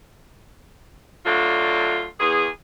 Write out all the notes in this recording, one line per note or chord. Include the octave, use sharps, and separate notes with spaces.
D3 F#3 A3 D4 F4
E2 G#4